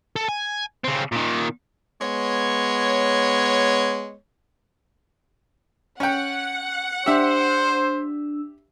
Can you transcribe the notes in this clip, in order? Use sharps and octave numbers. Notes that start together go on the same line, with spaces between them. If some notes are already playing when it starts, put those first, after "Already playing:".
A4
G#5
C#3 C4
A#2 D#3
G#3 B3 C#5
C#4 F#5 G5
D4 G4 C5 E5 E6